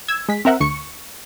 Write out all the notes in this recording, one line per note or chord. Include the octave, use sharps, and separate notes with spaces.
E6 G#6
G#3 B6
C4 A#4 E5 F#5
D2 C#6 C#7